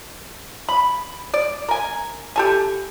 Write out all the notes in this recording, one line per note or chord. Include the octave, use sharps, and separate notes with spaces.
B5
D5
A#4 G#5
G4 A4 G#5